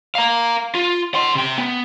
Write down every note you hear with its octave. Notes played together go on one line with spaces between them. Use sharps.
F5 A#5
F4
F#5 C6
C3 G5
B3